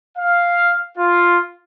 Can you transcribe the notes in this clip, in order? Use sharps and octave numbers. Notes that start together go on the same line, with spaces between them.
F5
F4